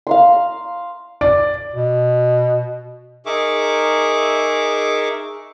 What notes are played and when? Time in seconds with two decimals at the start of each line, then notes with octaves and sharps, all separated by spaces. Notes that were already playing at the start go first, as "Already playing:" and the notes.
0.07 F5 A#5 C6
1.21 D5
1.74 B2
3.26 D#4 G#4 A#4 E5 C#6 D6